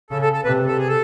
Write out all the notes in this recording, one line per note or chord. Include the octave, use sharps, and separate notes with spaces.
C#3 A4
A4
A4
C3 B4
A4
G#4
A4